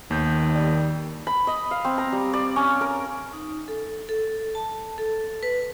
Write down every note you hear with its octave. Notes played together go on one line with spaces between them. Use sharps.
D#2 D#3 B3 G6
G3
B5
D#5
F5
C4
A#5
G3
D5
C#4
A#4
D#4
A4
A4
A5
A4
B4